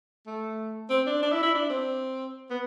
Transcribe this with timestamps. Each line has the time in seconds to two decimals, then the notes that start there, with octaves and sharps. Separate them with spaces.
0.27 A3
0.90 C4
1.07 D4
1.23 D4
1.32 E4
1.43 E4
1.54 D4
1.70 C4
2.50 B3